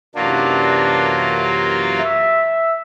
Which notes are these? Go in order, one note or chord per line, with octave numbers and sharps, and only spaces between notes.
F#2 C3 E3 F#3 A#3 D4 F4
E5